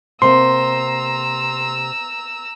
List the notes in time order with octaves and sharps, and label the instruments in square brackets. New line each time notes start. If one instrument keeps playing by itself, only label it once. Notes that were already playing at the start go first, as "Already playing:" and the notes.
[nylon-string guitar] C3 A#3 [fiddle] A#5 E6 [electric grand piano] C6